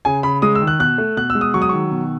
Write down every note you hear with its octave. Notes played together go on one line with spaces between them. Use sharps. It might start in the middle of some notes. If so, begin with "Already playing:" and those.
C#3 G#5
C#3 B5
G#3 D#6
E6
D#3
F#6
B2 F#6
A3
B2 F#6
E6
G#3
D#6
F#3 C#6
D#6
D#3 C#6
B2